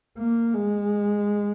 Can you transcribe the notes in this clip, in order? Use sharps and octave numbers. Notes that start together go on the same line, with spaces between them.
A#3
G#3